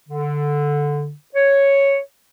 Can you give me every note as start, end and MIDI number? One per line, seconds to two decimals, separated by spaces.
0.09 1.12 50
1.35 1.98 73